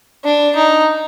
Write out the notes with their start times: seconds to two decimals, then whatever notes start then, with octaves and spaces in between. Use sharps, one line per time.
0.24 D4
0.56 D#4